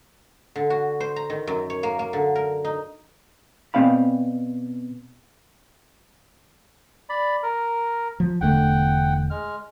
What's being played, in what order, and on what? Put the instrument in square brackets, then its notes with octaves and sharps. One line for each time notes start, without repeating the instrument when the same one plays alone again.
[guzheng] D3
F#4
C5
A#5
D#3
F#2
C#5
A#3
A#3
D3
A#4
D#4
[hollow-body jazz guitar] B2 G3 C4 D5 F5 B5
[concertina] D5 B5
A#4
[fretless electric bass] F3
[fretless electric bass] E1 D3 A3 [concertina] F#5 G5
[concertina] G#3 F6